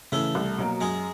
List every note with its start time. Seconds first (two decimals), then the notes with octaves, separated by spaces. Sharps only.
0.12 C#3 E3 A3 A4
0.35 C2
0.58 B2 F#3 A#3
0.81 F#2 G#3 G#4